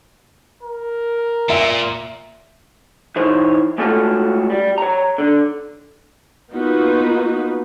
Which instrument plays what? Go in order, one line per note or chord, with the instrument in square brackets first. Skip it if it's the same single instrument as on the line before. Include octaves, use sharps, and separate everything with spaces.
[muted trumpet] A#4
[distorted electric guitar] A#2 [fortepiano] E5
[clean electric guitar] E3 D#4 C5 C#5
G#3 A3 C#4 F4 F#4 A4
G3
C#5 A#5
D3
[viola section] A#3 B3 D#4 F4 F#4 B4